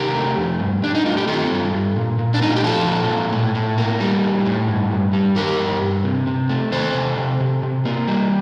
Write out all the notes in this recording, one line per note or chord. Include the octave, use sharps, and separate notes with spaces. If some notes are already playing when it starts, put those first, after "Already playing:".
Already playing: C3 D#3 G4 A#4
A3
F2
G2
G2 D4
D#4
A3 F4
G4
D#3 F4 A4
G2
G2
A#2
A#2
D4
A3 D#4
F4
G4
F3 F4 A4
A#2
A#2
A2
A2
A#3
G3
A2
A2
G2
G2
G3
D#3 G4 A#4
G2
G2
C3
C3
A3
D#3 A4 C5
C3
C3
C3
C3
A#3
G3